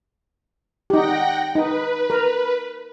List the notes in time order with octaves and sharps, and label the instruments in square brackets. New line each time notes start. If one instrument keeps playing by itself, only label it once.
[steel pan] D#4 G4 [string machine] F#5 G5 A#6
[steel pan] D#4 [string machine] B4
[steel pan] A#4